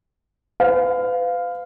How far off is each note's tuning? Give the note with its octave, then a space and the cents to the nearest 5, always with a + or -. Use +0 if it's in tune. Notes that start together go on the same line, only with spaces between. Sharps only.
B4 +40 F5 +0